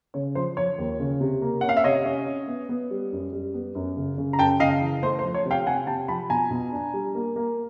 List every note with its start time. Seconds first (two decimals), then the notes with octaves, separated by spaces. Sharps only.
0.14 C#3 C#5
0.35 F3 C5
0.57 F3 C#5
0.78 D#2
1.00 C#3
1.21 C3
1.42 A#3
1.61 C#4 F#5
1.69 F5
1.77 E5
1.84 C3 C#5 D#5
2.06 C#4
2.27 C#4
2.48 B3
2.69 B3
2.91 G3
3.12 F#2
3.32 G3
3.54 B3
3.75 F#2
3.97 C#3
4.18 C#3
4.33 A#5
4.39 F#2 G5 A5
4.60 C#3 D#5 F5
4.81 E3
5.03 A3 C5
5.19 C5
5.24 F3
5.34 C#5
5.46 C3
5.51 F5 G5
5.66 C3 F#5 G#5
5.87 C3 G5 A5
6.08 F3 A5 B5
6.30 B2 G#5 A#5
6.51 B2
6.72 D4
6.93 G3
7.15 A#3
7.36 A#3